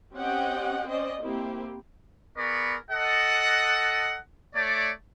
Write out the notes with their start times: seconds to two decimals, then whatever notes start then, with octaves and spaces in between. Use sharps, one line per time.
0.14 C4 C#4 G4 D#5 F#5 G5
0.88 C#4 C5 D5 D#5
1.20 A#3 C4 E4 G4
2.37 B3 G#4 A#4 D5 B5 C#6
2.91 A4 D#5 F#5
4.55 A3 C#5 D5